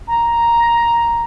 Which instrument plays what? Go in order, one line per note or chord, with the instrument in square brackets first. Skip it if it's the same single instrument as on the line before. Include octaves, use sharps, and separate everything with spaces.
[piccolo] A#5